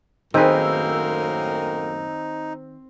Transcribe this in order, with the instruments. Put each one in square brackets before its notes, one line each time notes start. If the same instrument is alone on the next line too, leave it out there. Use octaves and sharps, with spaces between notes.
[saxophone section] F#2 A2 A#3 [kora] D#3 G#4 B4 [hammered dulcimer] C4 [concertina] D#4